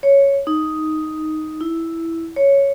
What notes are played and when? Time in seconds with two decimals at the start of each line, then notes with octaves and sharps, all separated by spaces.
0.03 C#5
0.47 D#4
1.61 E4
2.36 C#5